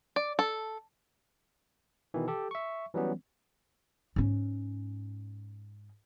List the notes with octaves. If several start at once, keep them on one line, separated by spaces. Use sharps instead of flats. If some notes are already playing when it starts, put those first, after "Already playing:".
D5
A4
B2 D#3 E3
G4 A4
E5 C#6
E3 F#3 G3 B3 C#4
G#2 C#4